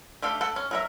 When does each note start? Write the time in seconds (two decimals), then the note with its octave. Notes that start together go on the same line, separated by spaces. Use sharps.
0.22 A3 G4 A4 F5
0.41 A4 F#5 G5
0.56 C#4
0.71 F#3 A#4 E5